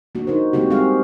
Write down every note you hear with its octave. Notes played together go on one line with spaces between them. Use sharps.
A#3 D4 F#4
D#4 F#4 A#4 C5
G#3 A#3 C4 F#4 G4
G3 C4 G4 G#4 F5